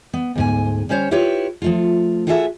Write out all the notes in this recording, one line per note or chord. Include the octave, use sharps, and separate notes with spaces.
B3
D2 G#2 G#5
G3 C#4 C5 C#5
E4 F4 G4 B4 C#5
F3 A3 F4
F4 F#4 G#4 A4 D#5 E5